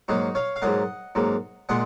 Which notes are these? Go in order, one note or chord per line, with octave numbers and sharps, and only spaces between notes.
G#2 F#3 A#3 D#4 F#4
C#5 F5
F5
G#2 F#3 A#3 D#5 F#5
G#2 F#3 A#3
A#2 G#3 D#5 F#5